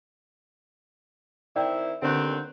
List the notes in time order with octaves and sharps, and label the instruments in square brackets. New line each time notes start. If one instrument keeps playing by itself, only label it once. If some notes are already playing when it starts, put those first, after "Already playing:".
[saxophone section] D#3 C4 E4 [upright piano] D5 G5
[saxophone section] D#2 B3 C4 [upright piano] D3 F#6